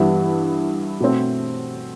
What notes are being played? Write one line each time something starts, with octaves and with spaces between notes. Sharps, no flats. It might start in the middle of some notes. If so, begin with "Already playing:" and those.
Already playing: G2 E3 G3 B3 E4
B2 A3 C4